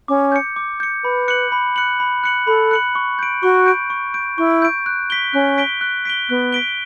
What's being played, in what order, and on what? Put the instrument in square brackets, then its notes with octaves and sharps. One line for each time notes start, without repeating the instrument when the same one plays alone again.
[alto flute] C#4 [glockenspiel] D6
[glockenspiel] G6 C#7
D6
G6 C#7
[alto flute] B4 [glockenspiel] B5
[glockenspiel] F#6 C#7 F#7
B5
F#6 C#7 F#7
B5
F#6 C#7 F#7
[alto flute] A4 [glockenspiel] B5
[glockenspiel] F#6 C#7 F#7
C#6
G6 D7
[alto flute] F#4 [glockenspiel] C#6
[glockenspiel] G6 D7
C#6
G6 D7
[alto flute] E4 [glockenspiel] C#6
[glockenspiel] G6 D7
F#6
B6 D7 G7
[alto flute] C#4 [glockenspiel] F#6
[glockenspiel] B6 D7 G7
F#6
B6 D7 G7
[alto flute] B3 [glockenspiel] F#6
[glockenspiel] B6 D7 G7